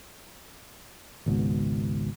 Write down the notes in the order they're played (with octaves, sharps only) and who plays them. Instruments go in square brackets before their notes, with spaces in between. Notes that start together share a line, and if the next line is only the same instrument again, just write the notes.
[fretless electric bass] G#1 C#2 G#2 B2